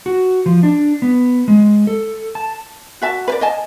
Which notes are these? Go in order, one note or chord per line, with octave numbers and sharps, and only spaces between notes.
F#4
F3
D4
B3
G#3
A4
A5
F#4 E5 A5
B4 D5
D#5 G#5 A5